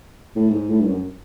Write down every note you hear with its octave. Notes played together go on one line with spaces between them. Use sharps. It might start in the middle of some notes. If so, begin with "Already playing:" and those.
A2
G#2
A2
G2
F#2